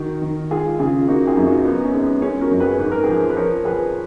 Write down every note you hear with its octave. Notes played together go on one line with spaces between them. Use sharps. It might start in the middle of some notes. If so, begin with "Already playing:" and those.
Already playing: D#3 F#4 A#4
D#3
G#3 F4 G#4
C#3 F4 G#4
A#3 D#4 F#4
F4 G#4
F#2
D#4 F#4
B3 D#4
C#4
G#3
B3
G#3 C#4
F#4 A#4
F#2
G#4 B4
G#2 B4
A#4
F3 G#4 B4
B4
F3 A#4 C#5
F3 G#4 B4